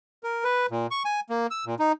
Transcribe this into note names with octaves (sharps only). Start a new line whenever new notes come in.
A#4
B4
A#2
C#6
G#5
A#3
E6
A#2
D#4